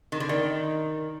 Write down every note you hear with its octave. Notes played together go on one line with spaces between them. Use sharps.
D#3
D3
D#3